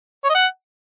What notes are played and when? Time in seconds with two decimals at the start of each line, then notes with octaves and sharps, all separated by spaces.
0.24 C#5
0.29 D#5
0.35 F#5